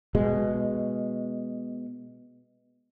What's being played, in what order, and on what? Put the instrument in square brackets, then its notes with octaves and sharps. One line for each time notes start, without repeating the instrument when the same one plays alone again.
[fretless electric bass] B2 G#3